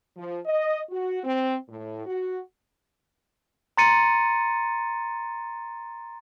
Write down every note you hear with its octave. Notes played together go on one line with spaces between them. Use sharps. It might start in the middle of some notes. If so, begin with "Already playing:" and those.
F3
D#5
F#4
C4
A2
F#4
A#5 C6 A6 C#7 D#7